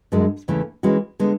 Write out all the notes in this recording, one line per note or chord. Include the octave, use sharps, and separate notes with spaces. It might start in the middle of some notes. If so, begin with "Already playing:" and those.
F#2 D3 G#3
E2 C#3 E3 A3
E3 G#3 C#4 F#4
D3 G#3 B3